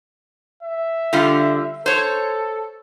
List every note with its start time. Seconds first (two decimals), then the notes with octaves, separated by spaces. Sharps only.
0.63 E5
1.13 D3 G3 F4
1.86 A4 C5 C#5